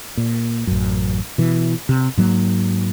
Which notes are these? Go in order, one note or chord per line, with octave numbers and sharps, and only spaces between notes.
A#2
A1 F#2
B2 E3
C3
G#2 F#3 G#3 A#3